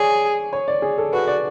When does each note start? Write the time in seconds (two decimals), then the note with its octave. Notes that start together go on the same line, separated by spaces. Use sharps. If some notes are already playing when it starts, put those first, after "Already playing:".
Already playing: G#4 C#5 D5
0.53 C#5
0.68 D5
0.82 G#4
0.98 A4
1.13 F#4 B4
1.27 D5